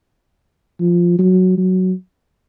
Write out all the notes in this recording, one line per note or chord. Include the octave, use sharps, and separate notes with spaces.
F3
F#3
F#3